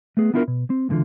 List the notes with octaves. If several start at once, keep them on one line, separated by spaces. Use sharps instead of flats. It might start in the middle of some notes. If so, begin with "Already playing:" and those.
A3 B3 G#4
B3 D4 E4 F4 G#4 A#4
B2
C4
C#2 A2 D3 E3 F4